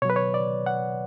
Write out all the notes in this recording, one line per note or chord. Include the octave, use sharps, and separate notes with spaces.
B2 F#3 B4 C#5
C#5
D5
F#5